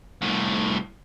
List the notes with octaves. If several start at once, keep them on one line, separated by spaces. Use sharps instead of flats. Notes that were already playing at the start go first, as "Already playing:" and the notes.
C2 A2